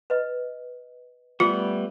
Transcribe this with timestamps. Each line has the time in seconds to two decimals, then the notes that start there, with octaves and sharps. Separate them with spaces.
0.10 B4 D#5
1.40 G3 A3 B3 F4